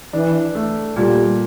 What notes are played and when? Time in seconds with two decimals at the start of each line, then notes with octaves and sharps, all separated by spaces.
0.13 E3 D4
0.55 A3
0.96 A#2 G3